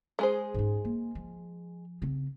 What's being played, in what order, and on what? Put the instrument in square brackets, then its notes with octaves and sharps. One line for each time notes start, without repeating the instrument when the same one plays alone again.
[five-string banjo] G#3 G#4 C5
[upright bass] G#2 C#4
A#3
F3
C#3 C4